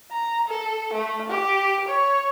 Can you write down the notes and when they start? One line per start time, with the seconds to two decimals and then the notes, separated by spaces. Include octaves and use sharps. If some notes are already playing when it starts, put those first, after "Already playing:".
0.11 A#5
0.48 A4
0.93 A3
1.30 G4
1.88 C#5